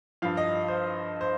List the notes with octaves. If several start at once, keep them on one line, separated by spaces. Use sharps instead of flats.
G2 F3 F5
D#5
C5
C5